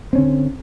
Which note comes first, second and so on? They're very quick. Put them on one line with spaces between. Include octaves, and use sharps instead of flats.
C4 C#4 D3